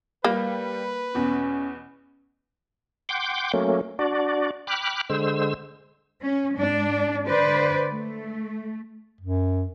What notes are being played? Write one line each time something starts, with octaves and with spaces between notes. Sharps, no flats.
G3 A#3 B4
E2 B2 C#4
F#5 G5 C6 D6 G6
F#3 A3 A#3 C#4
D4 F#4 D5
G5 B5 D6 F6 F#6
D3 G#3 C5 E6
C#4
G#2 D4
D3 B4 C5 D5
A3
F#2